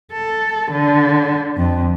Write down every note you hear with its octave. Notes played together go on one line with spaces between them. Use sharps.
A4
D3
F2